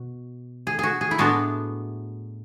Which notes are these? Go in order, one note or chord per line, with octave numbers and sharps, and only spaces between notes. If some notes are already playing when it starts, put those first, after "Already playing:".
Already playing: B2 F#4
G#4
F#4 G#4
G#4
E4
A2 G#3 B3 D4 F#4